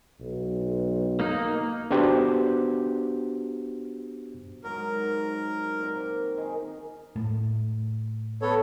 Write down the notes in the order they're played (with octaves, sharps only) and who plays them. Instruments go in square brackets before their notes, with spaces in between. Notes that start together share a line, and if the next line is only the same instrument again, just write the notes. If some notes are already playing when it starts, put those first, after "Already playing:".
[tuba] B1
[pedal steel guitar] A#3 D#4
[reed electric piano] B3 D4 F#4 G4 C5
[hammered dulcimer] G#2 D#3 F#3 [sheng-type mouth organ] A#4
[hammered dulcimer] A#2 C4
D#3 D#4 G#4
[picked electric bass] A2
[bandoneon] B3 A4 C#5